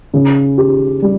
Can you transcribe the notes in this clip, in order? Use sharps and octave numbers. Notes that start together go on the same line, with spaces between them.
C#3
G4
G3